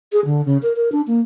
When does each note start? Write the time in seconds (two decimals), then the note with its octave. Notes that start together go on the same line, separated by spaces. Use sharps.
0.13 G#4
0.25 D3
0.45 C#3
0.63 A#4
0.76 A#4
0.92 D4
1.07 A#3